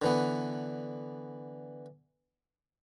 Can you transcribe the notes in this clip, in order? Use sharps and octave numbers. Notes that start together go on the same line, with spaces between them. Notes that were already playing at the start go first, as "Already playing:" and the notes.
D3 E3 B3